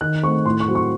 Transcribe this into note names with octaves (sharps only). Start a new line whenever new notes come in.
D#3 F#6
A3 C4 C#6
A2 C6
C#6
F#3 C4
C#6